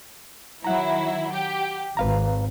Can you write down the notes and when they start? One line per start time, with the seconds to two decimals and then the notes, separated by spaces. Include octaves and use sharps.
0.64 D#3 F#3 E4 F#5 A#5
1.31 G4
1.97 G#1 B4 F5 A#5